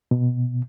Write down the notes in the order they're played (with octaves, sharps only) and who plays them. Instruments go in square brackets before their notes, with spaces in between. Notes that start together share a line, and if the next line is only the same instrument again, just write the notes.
[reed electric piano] B2